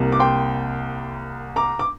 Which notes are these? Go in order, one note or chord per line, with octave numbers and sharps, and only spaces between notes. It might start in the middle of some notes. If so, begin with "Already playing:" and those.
Already playing: C2 C3 A#3
D6
G5 C6
A#5 D6
D6